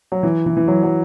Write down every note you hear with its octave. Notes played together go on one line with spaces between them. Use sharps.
F#3
E3
E3
E3
F#3
F#3